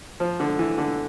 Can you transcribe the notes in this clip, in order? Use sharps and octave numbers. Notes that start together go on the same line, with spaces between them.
F3
D3
E3
D3